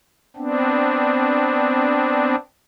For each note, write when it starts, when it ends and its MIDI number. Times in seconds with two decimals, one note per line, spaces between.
0.37 2.36 59
0.37 2.36 60
0.37 2.36 62